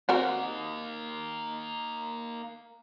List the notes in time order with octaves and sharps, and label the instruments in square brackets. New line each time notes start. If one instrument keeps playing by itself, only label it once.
[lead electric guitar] A#3 D#4 [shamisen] C4 F#4 A#4